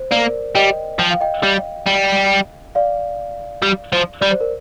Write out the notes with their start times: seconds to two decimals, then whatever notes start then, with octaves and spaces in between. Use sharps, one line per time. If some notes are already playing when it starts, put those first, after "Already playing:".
Already playing: C5
0.11 A#3 A#4 D5
0.55 G3 D#5 G5
0.99 F3 G5
1.11 F5
1.21 D#5 G5
1.43 G3
1.86 G3
2.75 D5 F5
3.62 G3
3.93 F3
4.21 G3 D5
4.31 C5
4.41 A#4